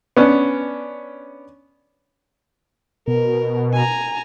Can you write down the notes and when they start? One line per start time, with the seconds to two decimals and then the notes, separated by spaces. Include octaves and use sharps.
0.17 B3 C#4 D4
3.08 B2 A#4
3.73 G#5 A#5